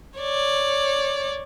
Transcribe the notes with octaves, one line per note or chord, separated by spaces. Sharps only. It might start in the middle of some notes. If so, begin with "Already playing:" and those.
C#5 D5